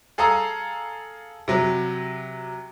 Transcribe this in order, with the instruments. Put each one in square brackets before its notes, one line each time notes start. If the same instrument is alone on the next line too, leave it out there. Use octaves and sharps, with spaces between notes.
[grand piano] G#4 A4 F5 A#5 D#6 E6
C3 F#3